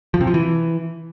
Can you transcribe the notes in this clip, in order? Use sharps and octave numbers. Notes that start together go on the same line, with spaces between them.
F3
C3
F3
E3